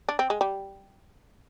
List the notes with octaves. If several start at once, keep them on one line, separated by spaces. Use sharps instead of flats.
D4
C4
G#3
G3